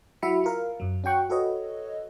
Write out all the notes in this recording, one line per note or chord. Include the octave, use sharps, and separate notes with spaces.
F#3 E4 F#4 E5 B5 C#7
F4 A#4 F5
F#2 F#3
C#4 F#4 G5 C#6 F#6
F#4 A4 B4 C#5 D#5